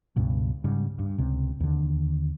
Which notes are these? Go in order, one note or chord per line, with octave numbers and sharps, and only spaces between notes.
C#2 G2 B2
G#2 C#3 G3
G2
C#2 C3
D#2 D3